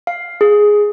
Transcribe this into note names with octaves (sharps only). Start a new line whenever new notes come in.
F5
G#4